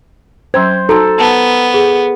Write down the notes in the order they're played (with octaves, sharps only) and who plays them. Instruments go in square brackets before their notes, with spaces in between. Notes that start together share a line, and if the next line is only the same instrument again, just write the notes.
[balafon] F#3 C#4 G5 [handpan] C5 [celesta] G#6
[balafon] D#4 F#4 C6 [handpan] A4 [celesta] A#5
[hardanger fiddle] B3 [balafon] F#5 A5
[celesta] G#4